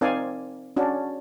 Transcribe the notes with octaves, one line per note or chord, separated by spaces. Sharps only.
C4 D#4 A#4 D5 F5 G#5
C#4 D4 F#4